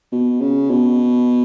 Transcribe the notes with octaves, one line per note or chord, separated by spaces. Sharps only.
B2
C#3
B2